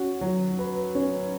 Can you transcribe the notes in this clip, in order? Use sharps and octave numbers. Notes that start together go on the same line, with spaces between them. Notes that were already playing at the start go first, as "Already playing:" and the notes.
Already playing: C#4 F#4
F#3
B4
C#4